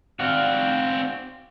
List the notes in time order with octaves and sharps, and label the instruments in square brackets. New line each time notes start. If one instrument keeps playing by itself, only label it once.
[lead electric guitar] C4 F#4 [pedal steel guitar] D5 F5